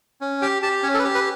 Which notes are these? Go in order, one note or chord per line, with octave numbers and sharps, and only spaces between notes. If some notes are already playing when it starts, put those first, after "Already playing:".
C#4
G4 G5
G4 A5
C#4 C#5
A4
B4
G4
B4